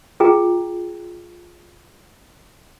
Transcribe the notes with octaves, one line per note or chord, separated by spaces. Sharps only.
F4 G#4 G5 A#5